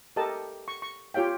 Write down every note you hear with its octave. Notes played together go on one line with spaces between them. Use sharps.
G4 A4 A#4 D#5 A5
C#6
C#6
F4 G4 C#5 F5 G5